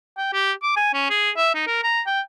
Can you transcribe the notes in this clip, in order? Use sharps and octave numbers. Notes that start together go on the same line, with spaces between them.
G5
G4
D6
G#5
C#4
G#4
E5
D#4
A#4
A#5
G5